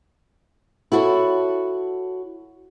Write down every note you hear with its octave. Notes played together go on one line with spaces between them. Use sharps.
E4 F#4 A4 B4 C#5